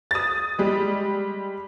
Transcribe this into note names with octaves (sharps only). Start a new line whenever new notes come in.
D#6 A6
G3 G#3